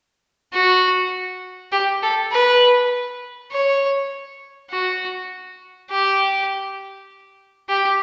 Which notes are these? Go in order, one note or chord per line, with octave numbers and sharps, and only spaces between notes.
F#4
G4
A4
B4
C#5
F#4
G4
G4